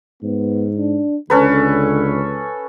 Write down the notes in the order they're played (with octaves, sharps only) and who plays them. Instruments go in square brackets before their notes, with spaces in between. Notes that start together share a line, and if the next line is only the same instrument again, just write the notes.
[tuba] G#2 [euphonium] B3
[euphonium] D4
[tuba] C#2 [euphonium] D3 [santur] C#4 A4 B4